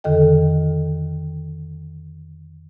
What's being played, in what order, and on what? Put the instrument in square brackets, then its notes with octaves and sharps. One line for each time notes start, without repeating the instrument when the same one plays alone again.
[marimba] F2 D3 D#3 A4 D#5 G5